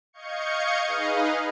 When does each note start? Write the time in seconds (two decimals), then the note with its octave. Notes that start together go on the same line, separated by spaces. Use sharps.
0.13 D#5 F5 C#6 G6 G#6 C#7
0.86 D#4 G#4 B4 D#5 F5